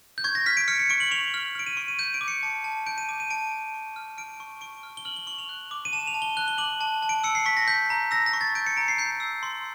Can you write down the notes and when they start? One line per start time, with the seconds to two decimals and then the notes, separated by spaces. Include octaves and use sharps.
0.18 G6
0.24 C#6 G#6
0.35 A#6
0.46 F6 B6
0.57 D7
0.68 F6 C#7
0.79 C#7
0.90 C#6 D7
1.00 F#7
1.11 C#6 F7
1.34 F6
1.55 F6 D7
1.66 D#7
1.77 C#6
1.88 D#7
1.99 G6 D#7
2.14 D7
2.21 D6
2.28 C#7
2.43 A5
2.64 A5
2.87 G6 D7
2.98 D#7
3.09 D6 D#7
3.20 D#7
3.30 A5 D7
3.52 A5
3.74 C#6
3.96 F6
4.18 F6 D7
4.40 C#6
4.61 C#6 D7
4.83 F6
4.97 G7
5.05 F6 F#7
5.16 G7
5.27 C#6 F#7
5.39 F7
5.49 F#6
5.71 D6
5.85 D#7
5.93 A5 E7
6.07 F7
6.14 A5
6.22 G7
6.37 F#6 G7
6.48 G7
6.58 D6 F#7
6.81 A5
7.02 A5
7.09 D7
7.24 E6 C#7
7.35 C7
7.46 C#6 B6
7.57 A#6
7.68 G6 B6
7.90 A#5
8.11 E6 A#6
8.26 A#6
8.33 C#6
8.41 A6
8.55 G6 D7
8.67 C#7
8.77 A#5 D7
8.88 C7
8.98 G6 C7
9.20 E6
9.43 C6